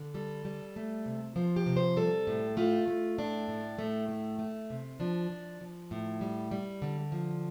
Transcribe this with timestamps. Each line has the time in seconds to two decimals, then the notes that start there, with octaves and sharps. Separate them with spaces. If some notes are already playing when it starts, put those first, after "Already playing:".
Already playing: D3
0.14 G3 A4
0.45 G3
0.76 A3
1.06 C3
1.36 F3 C5
1.56 G4
1.66 C3
1.77 C5
1.96 G3 A4
2.27 A2
2.57 A3 F4
2.88 A3
3.18 A2 D4
3.48 A2
3.78 A2 A3
4.09 A3
4.39 A3
4.70 C3
5.00 F3 D4
5.30 F3
5.61 F3
5.91 A2
6.21 G3
6.51 G3
6.82 D3
7.12 F3